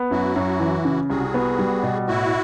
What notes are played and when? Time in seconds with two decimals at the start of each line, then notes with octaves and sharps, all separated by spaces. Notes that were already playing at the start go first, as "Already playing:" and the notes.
Already playing: B3
0.11 F#2 E4 F#4
0.36 F#2
0.60 E3
0.85 C#3
1.09 C2 F#4 G#4
1.34 B3
1.59 G3
1.83 B2
2.07 A2 E4 F#4